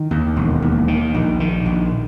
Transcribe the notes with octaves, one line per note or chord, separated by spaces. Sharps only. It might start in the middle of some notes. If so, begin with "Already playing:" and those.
Already playing: D#3
D#2
E1
D#2
D#3
A#1
D#3
A#1